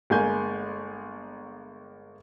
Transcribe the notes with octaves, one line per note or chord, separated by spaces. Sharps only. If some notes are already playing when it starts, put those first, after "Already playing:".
G1 G#3 A#3 G#5 G6